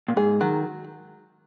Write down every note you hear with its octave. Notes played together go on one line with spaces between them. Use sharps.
A#2
G#2 G#4
D#3 F#3